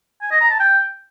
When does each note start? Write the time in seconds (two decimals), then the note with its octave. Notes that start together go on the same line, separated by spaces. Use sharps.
0.22 G#5
0.31 D#5
0.41 A#5
0.50 A5
0.60 G5